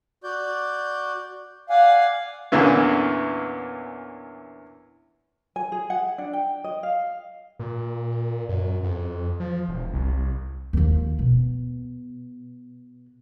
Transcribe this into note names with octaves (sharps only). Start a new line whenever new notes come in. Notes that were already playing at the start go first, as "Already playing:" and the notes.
F#4 D5 G6
D5 F5 F#5 G#5
E2 A#2 D3 E3 C#4
G#5
G#4
F#5
D4
G5
D#5
F5
A#2
F#2
F2
F3
E1
C2
D#2 F3
B2